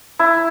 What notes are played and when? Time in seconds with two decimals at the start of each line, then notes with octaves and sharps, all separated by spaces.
0.19 E4